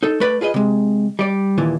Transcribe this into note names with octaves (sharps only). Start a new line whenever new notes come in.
D#4 A4
A3 B4 D5
F4 G#4 B4 D#5
C3 G#3
G3 D5
D#2 A#2 E3